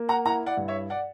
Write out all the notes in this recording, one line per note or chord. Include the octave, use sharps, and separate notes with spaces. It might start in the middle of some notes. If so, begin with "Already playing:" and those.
Already playing: A#3
F#5 A#5
E4 F#5 A#5
D5 F#5
G2
C#5 E5
D5 F#5